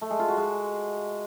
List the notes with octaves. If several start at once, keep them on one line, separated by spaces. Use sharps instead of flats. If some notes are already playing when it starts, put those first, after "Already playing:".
A3
G#3
F4
F#4
G#3